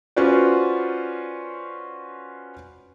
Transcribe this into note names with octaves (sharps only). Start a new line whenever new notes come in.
C#4 F4 F#4 B4 C5 D5